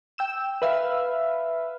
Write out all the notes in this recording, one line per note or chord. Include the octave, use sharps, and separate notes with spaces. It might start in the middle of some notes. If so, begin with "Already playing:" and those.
G5 E6 E7
B4 E5 F5